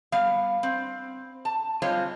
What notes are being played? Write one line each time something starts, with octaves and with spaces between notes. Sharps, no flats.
G3 B3 F5
C4
A5
G3 G#3 C4 F4 C#5